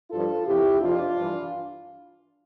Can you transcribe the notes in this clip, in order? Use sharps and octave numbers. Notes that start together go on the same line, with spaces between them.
G2 F3 F4 A4
E2 C3 F3 E4 G4
F2 C3 F3 D4 F4
G2 E3